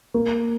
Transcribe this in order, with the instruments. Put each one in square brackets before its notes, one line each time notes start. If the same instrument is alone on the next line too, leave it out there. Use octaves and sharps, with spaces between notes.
[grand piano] A#3